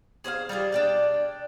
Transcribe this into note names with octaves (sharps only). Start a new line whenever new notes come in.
G#4 C5 D5 F5
G3 A3 F4 G#4
D4 D5 G5